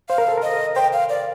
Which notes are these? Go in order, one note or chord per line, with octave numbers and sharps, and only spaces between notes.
C5 F5
A#4
A4
A#4 D#5
C5 G5
F5
D5